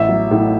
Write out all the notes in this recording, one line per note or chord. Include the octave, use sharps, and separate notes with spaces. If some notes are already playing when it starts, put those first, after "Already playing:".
Already playing: A1 E5
F#3
A2